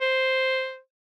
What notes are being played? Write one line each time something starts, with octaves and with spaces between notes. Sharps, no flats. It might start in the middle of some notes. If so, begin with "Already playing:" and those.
C5